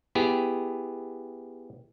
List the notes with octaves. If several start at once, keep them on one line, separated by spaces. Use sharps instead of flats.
B3 E4 G4 G#4